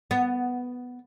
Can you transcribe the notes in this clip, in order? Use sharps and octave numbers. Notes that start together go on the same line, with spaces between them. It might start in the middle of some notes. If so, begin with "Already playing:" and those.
B3